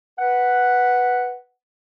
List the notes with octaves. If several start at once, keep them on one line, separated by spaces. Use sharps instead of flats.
B4 F#5